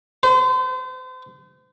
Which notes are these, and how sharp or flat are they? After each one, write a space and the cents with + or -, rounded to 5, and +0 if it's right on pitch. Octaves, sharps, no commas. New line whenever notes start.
C5 -40